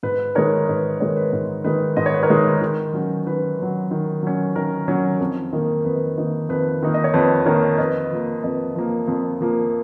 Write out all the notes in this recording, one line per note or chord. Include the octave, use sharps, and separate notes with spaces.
G#2 B4
D#3 G#3 D#4 A#4 C#5
G#2 B4 D#5
D#3 G#3 D#4 A#4 C#5
B4
G#2 A#4
D#3 G#3 D#4 B4
G#2 D#5
C#5
B4
A#4 C#5
D#3 G#3 D#4
D#3
F#3 C#4
D#3 B4
F#3 C#4
D#3
F#3 C#4
D#3 A#4
F#3 C#4
F2
D#3 A#3 D#4
F2 B4
D#3 A#3 D#4
F2 B4
D#3 A#3 D#4
D#5
C#5
F2 B4
D#3 A#3 D#4 A#4 C#5
F2 B4 D#5
F3 A#3
F2 B4 D#5
F3 A#3
F2
F3 A#3